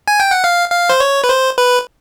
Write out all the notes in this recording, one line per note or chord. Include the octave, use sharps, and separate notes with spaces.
G#5
G5
F#5
F5
F5
C5
C#5
B4
C5
B4